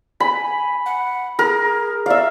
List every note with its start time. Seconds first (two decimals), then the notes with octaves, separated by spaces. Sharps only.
0.20 G#5 B5
0.86 F#5
1.39 G#4 A#4
2.06 D5 E5 F5